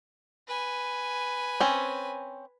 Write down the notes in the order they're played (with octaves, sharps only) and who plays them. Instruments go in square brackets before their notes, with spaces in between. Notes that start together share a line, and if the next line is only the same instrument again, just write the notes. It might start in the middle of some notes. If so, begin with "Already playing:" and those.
[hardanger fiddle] B4 G#5
[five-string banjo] C4 C#4